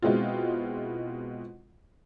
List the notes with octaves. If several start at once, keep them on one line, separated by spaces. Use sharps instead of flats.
B2 G#3 C4 E4 F4